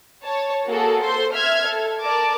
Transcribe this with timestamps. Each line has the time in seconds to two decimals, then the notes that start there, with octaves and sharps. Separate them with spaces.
0.24 C#5 A5
0.65 A#3 F#4 G#4 A4
1.00 A4 C5 C6
1.33 E5 F6 G#6
1.66 A4
2.00 A#4 D5 A5 D6